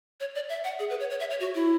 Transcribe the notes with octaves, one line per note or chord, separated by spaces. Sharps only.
C#5
D5
E5
F#5
G#4
B4
C#5
C#5
E5
C#5
F#4
E4